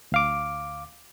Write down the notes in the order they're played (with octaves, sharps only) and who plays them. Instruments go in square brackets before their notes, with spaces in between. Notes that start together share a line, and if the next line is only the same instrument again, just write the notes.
[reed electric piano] D2 F5 D6